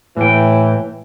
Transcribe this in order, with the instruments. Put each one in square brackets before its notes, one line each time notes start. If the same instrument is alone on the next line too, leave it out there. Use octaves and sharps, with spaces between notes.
[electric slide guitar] A2 G5 [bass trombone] E3